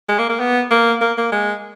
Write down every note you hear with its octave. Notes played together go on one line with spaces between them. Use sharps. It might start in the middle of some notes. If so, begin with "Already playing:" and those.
G#3
A#3
A#3
B3
A#3
A#3
A#3
G#3